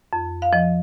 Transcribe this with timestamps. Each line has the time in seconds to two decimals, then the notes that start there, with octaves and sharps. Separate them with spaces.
0.13 F2
0.42 F5
0.53 F3 D#5